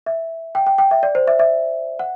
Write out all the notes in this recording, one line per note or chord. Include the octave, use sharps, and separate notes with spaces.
E5
G5
G5
G5
E5
D5
C5
E5
E5
F#5